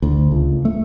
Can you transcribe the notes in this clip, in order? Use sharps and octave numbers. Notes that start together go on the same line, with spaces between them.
D2
C#2
A3